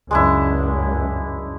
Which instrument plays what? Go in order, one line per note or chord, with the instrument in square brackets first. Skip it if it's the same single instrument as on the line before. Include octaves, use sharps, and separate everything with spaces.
[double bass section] C#2 F#2 [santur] G#3 D4 E4